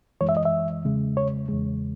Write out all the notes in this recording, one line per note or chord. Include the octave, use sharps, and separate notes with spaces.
F#2 E3 G#3 C#5
E5
D#5
E5
E2 C#3 G#3
C#5
E2 C#3 G#3